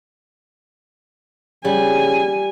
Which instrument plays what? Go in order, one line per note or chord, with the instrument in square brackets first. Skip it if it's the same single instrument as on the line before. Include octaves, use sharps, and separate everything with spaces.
[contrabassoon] C#3 [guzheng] G3 [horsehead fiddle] G#5